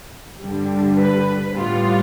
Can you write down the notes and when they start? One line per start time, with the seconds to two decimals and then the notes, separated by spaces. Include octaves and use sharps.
0.41 G2 D3 G3
0.98 B4
1.54 A2 G3 B3 F4